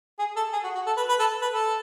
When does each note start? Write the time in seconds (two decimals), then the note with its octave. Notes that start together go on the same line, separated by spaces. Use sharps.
0.19 G#4
0.36 A4
0.53 G#4
0.64 F#4
0.75 F#4
0.87 A4
0.97 B4
1.09 B4
1.20 A4
1.42 B4
1.54 A4